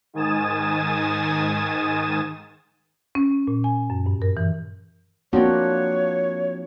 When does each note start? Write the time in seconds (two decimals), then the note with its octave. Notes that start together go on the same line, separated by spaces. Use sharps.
0.14 G#2 D#3 G#5 D#6 A6 E7
3.15 C#4
3.47 A#2
3.64 G#5
3.90 F#2
4.06 G2
4.22 A#4
4.37 E3
5.33 F3 A#3 C4 D4 F#4 C#5